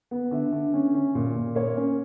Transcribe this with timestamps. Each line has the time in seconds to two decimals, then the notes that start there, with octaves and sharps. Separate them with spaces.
0.11 B3
0.31 D3 E5
0.52 D3
0.73 C#4
0.94 C#4
1.15 A#2
1.35 A#2
1.55 A#3 C#5
1.77 C#4